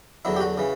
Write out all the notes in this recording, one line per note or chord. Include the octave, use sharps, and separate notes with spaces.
E2 D3 F#3 E4
G4
F#4
C#3 E3